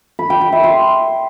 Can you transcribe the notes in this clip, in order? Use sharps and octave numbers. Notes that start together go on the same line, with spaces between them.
B5
G5
B5
E5
C6